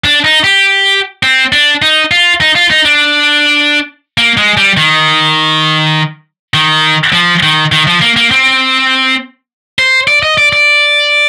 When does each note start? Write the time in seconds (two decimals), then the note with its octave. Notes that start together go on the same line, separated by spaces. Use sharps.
0.05 D4
0.24 D#4
0.44 G4
1.23 C4
1.52 D4
1.82 D#4
2.11 F4
2.41 D#4
2.55 F4
2.70 D#4
2.85 D4
4.18 A#3
4.38 G#3
4.57 G3
4.77 D#3
6.54 D#3
7.13 F3
7.43 D#3
7.72 D#3
7.87 F3
8.01 A#3
8.16 A#3
8.31 C4
9.79 C5
10.08 D5
10.23 D#5
10.38 D5
10.53 D5